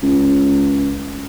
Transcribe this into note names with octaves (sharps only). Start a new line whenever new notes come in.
C#2